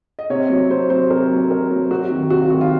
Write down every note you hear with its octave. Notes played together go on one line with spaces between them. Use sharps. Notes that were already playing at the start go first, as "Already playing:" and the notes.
D#5
C3 C#5
F#3
C3 C5
F#3 C5
C3 A#4
F#3
C3 A#4
F#3
C3 F#4
D#3 F#3
C3 F#4
F4
D#3 F#3 F#4
F4